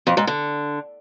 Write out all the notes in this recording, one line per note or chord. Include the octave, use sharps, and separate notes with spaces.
F2
G#2
D3